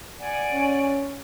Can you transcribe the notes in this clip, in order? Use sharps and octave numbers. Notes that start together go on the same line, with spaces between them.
D5 F#5 G#5
C#4